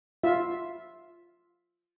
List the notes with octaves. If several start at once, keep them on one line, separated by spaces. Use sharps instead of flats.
F4 E5